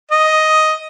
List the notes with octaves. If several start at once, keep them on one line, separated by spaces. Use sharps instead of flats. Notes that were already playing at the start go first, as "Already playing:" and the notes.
D#5